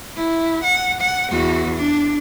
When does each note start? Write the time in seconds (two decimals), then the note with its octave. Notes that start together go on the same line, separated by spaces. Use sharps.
0.16 E4
0.64 F#5
1.01 F#5
1.31 E2 F#4
1.76 D4